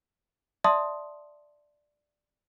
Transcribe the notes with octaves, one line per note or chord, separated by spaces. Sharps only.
D5 E5 A5 C6 D#6